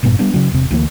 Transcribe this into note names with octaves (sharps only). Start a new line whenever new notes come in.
F#1 G2 A#2 B3
G3 B3 D4
C#3 F#3
E1 C3
D2 E3 A3 A#3